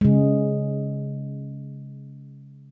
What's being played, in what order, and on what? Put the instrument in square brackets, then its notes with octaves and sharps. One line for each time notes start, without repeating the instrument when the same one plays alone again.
[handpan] C#3 G#3